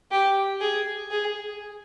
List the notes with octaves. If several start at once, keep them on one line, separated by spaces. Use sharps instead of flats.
G4
G#4
G#4